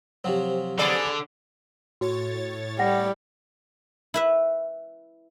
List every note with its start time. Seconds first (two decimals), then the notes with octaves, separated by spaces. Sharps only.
0.24 C3 F3 F#3 G4 C5
0.78 D3 B3 G#4 D5
2.01 A2 F#4 C#5 A6
2.79 G3 F#5 G5 A#6
4.14 E4 B4 E5